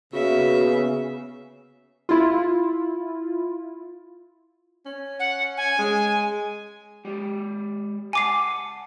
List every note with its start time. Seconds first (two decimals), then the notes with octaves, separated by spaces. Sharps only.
0.13 C#3 A#3 B3 F#4 E5
2.09 E4 F4
4.86 C#4
5.20 F#5
5.57 G#5
5.79 G#3
7.05 G#3 G4
8.13 F#5 G#5 A5 D6 C7